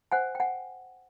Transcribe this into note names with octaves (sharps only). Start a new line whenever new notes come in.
C5 F#5 G#5
G5
F#5 G#5